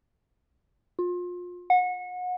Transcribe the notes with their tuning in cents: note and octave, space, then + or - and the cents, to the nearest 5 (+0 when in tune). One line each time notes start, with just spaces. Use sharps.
F4 +30
F#5 -30